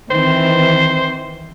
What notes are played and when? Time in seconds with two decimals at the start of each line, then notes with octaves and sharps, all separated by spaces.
0.11 D#3 E3 C4 C5